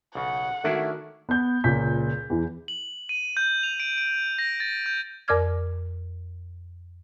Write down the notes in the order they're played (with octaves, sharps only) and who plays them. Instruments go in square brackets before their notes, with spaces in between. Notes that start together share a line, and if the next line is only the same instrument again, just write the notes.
[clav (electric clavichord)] B1 C#3 [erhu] F#5
[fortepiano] D#3 F#4 [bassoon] A3 [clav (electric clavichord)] C#4 D4 E4
[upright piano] B3 G6
C#2 A#2 G6 B6
E2 E3
[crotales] F#7
D#7
G6
F7
D7
D7
A#6
A6
G6
[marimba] F2 A#4 D5 D6 F6 G#6